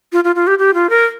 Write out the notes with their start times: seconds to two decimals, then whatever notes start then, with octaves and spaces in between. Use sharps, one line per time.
0.13 F4
0.24 F4
0.36 F4
0.47 G4
0.59 G4
0.74 F4
0.90 A#4